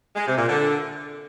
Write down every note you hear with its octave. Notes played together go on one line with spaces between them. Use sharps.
G#3
C3
A#2
D3